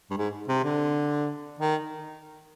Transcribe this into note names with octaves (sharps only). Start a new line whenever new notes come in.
G2
G#2
C3
D3
D#3